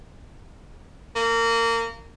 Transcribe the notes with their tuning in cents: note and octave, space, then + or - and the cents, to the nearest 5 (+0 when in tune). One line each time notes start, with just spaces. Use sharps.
A#3 -25